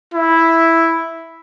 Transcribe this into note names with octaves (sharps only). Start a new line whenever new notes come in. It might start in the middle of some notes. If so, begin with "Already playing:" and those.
E4